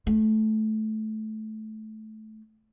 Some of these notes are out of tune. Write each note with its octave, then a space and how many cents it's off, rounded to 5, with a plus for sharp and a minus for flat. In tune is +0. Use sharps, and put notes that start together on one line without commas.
A3 -15